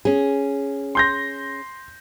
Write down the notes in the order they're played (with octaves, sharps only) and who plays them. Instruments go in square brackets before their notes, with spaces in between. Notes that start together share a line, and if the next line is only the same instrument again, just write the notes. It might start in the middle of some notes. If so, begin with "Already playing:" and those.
[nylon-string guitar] C#4 G#4
[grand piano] C6 G6 A#6